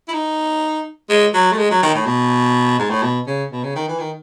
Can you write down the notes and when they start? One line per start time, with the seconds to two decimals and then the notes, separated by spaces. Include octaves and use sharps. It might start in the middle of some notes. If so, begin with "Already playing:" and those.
0.08 E4
0.13 D#4
1.10 G#3
1.34 F#3
1.52 A3
1.58 G#3
1.71 F#3
1.83 D#3
1.95 A2
2.06 B2
2.79 G#2
2.90 A2
3.03 B2
3.27 C#3
3.52 B2
3.63 C#3
3.76 D#3
3.88 E3
4.00 D#3